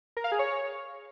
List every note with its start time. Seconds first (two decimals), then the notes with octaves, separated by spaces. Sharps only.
0.17 A#4
0.24 F5
0.32 G#4
0.39 C#5